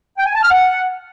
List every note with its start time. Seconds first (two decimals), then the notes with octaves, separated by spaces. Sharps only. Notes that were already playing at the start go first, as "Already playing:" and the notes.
0.18 G5
0.26 G#5
0.34 A5
0.43 F6
0.51 F#5